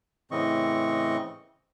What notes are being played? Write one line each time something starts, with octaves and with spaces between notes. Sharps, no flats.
A2 C#3 E3 C4 D#5 C#6